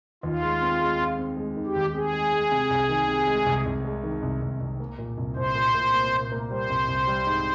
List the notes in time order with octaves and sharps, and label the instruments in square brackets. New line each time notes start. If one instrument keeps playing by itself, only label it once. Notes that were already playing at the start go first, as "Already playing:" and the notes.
[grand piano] D#2 [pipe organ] F4
[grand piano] G#3
C4
G#3
C4
C4
G#3
D#3
[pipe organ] G4
[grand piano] D#2
[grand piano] C4 [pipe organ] G#4
[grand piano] G#3
G#3
C3
C2
D#3
C3
G#3
C2
C2
G#3
D#3
C2
C2
C2
A#3
A#2
C2
[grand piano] C2 [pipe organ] C5
[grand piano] A#2
A#2
A#3
A#2
A#3
[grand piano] G3 [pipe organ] C5
[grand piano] C2
C2
G3
G#2